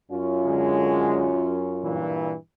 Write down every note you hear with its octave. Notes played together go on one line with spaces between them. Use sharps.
F#2 C#4 F4
D3 G#3
G2 A#2 E3